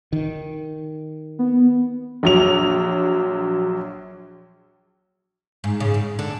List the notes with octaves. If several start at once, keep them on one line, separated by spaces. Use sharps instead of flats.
D#3
B3
A#1 F#3 F7
G#2
C#3
G#2
D3